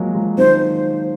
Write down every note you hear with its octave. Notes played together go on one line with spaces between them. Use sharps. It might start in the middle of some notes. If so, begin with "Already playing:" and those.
Already playing: F3 F#3 G#3 A#3
F3 G#3
D#3 F#3 C5